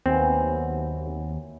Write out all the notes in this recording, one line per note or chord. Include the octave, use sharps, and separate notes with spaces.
D#2 B2 E3 F#3 C4